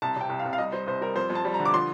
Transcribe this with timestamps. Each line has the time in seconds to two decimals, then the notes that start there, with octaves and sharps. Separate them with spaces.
0.02 C2 A5
0.16 C3 G5
0.29 C2
0.39 F5
0.45 C2
0.53 F5
0.58 G3 D#5
0.72 G3 C5
0.87 C2 C5
1.01 G3 A#4
1.15 F2 C5
1.30 F2
1.35 A5
1.45 G3
1.54 A#5
1.60 D3
1.66 D6
1.74 F3 C6